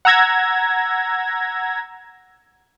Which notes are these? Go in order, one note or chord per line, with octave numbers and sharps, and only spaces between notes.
F#5 A#5 E6 G#6 A#6